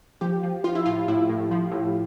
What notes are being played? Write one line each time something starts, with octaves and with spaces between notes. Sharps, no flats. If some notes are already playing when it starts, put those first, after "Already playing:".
F3 G4
F3
F3 F4
E4
A2 F4
A2 E4
A2
F3
A2